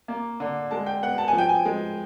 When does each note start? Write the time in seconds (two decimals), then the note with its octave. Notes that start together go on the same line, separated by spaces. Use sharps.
0.08 A#3
0.40 D3
0.71 G#3 A5
0.86 G5
1.02 B3 F#5
1.18 A5
1.28 G#5
1.33 F3
1.38 G5
1.49 G#5
1.65 G#3